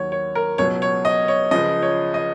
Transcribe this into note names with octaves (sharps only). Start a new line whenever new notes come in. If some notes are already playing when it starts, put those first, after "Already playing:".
Already playing: D#2 D#3 F#3 C#5
C#5
A#4
C#2 B2 F#3 C#5
C#5
D#5
C#5
C#2 C#3 F3 D#5
C#5
D#5